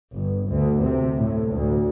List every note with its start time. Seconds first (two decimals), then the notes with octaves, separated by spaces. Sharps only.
0.14 G1
0.50 D2
0.83 C3
1.17 A2
1.52 D2